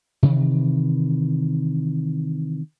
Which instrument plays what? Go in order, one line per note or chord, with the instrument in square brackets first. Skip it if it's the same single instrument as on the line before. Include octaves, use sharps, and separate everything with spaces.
[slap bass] C3 D#3 E3